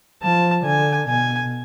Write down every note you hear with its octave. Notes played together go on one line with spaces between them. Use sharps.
F3 A5
D3 G#5
B2 G#5